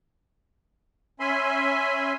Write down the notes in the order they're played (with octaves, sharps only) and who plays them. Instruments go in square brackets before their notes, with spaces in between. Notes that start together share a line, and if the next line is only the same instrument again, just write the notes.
[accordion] C#4 E5 G#5 B5 C6